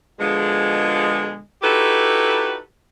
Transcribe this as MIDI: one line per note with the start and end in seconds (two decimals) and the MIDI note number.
0.20 1.39 47
0.20 1.39 50
0.20 1.39 53
0.20 1.39 56
1.63 2.57 63
1.63 2.57 64
1.63 2.57 66
1.63 2.57 67
1.63 2.57 69
1.63 2.57 71